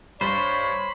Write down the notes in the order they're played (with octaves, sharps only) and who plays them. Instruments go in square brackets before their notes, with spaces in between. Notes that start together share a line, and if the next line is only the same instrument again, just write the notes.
[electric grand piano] G2 [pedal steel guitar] C5 [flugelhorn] C#5 [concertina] B5